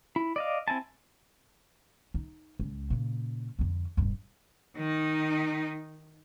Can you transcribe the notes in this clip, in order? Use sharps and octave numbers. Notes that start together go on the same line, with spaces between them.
E4
D5 D#5 F5
C4 E4 G#5 A5
D#4
C#2
A#2 C#3
F2 D3
E1 G2
D#3 D#4